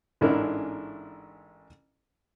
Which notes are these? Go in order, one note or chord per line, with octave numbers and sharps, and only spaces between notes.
A1 G#2 C#4 D4 E4 A#4